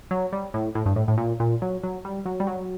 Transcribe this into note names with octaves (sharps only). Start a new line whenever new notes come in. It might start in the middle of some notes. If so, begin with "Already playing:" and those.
F#3
G3
A2
A2
G2
A2
A2
A#2
A#2
F#3
F#3
G3
F#3
G3
F#3